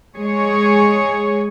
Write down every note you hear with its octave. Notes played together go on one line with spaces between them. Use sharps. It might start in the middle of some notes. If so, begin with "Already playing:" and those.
G#3 G#4 C#5